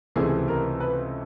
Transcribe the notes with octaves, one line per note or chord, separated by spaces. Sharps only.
C#2 C3 E3 A3 C4 G#4
A#4
B4